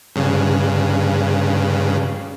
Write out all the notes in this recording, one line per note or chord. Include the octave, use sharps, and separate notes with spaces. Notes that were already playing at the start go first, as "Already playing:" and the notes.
G2 C#3